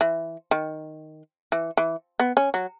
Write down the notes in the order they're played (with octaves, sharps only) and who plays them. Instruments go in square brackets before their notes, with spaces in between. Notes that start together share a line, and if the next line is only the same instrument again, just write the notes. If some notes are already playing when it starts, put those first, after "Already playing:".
[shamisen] E3
D#3
E3
E3
B3
C#4
F#3